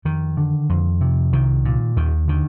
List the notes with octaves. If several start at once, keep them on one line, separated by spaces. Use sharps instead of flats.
F2 D#3
D3
F2
C3
C2 D#3
A#2
D#2 D#3
D3 D#3